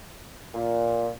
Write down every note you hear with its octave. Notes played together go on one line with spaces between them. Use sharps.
A#2